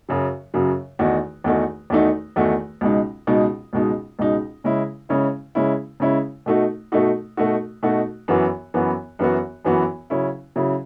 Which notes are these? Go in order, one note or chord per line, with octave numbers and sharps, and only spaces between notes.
F#2 C#3 F#3
F#2 C#3 F#3
E2 D#3 A3 D#4 F#4
E2 D#3 A3 D#4 F#4
E2 D#3 A3 D#4 F#4
E2 D#3 A3 D#4 F#4
C#2 B2 G#3 D#4
C#2 B2 G#3 D#4
C#2 B2 G#3 D#4
C#2 B2 G#3 D#4
C#3 G#3 C#4 E4
C#3 G#3 C#4 E4
C#3 G#3 C#4 E4
C#3 G#3 C#4 E4
B2 A3 D#4 F#4
B2 A3 D#4 F#4
B2 A3 D#4 F#4
B2 A3 D#4 F#4
F#2 E3 B3 F#4
F#2 E3 B3 F#4
F#2 E3 B3 F#4
F#2 E3 B3 F#4
C#3 F#3 C#4 E4
C#3 F#3 C#4 E4